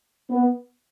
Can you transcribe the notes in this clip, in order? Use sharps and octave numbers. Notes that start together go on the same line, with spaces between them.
B3